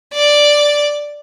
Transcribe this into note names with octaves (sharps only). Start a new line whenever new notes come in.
D5